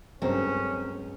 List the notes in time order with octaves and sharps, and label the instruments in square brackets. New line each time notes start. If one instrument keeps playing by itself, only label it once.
[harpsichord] C#2 [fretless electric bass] G2 F#3 [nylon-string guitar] C4 A4 A#4 [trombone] C#4